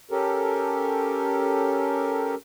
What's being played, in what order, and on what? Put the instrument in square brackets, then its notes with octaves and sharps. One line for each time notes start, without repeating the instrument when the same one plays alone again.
[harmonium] C#4 G4 A4 A#4